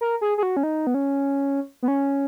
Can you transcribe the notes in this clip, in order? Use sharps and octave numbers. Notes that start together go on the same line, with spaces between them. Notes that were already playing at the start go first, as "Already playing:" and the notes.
A#4
G#4
G#4
F#4
C#4
D#4
B3
C#4
B3
C#4